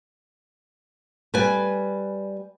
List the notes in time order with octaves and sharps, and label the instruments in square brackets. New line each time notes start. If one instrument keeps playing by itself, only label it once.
[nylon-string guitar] G3 B4 G#5